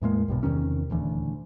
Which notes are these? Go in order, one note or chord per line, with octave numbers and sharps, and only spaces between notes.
E2 A2 G#3 A#3
B1 G2 B2
E2 C3 D#3 C#4
D#1 D2 E3